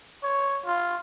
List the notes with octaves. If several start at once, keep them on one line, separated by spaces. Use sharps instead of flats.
C#5
F4